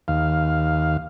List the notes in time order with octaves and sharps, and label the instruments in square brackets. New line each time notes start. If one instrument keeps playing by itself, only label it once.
[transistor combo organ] D#2 F5